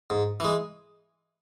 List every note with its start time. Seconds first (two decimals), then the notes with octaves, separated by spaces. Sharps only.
0.10 G#2
0.40 E3 G#3